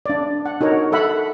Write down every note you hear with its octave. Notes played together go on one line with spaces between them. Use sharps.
D4 D5
F#5
D#4 F#4 A#4 C#5
A4 E5 F#5 B5